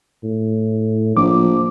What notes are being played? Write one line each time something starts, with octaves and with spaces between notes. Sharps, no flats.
A2
A#1 F3 D6